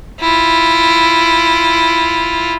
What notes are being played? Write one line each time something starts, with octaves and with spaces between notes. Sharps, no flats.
E4 F4